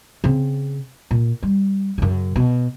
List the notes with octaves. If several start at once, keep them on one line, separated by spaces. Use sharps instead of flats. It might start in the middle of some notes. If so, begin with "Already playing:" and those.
C#3 C4
A#2
G3
F#2 C#3
B2